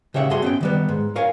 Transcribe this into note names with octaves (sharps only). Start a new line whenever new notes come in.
C#3 G4 C#5 E5 F#5
G2 F#4 G#4 C6
B3 C#4 G5
D#3 G3 B3
G#2
A#4 C#5 F5 G#5